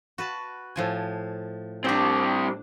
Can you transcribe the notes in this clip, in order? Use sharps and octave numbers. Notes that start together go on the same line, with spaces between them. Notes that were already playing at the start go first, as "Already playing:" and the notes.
F#4 B4 A5
A2 F3 G#5
G3 C4 D4 C5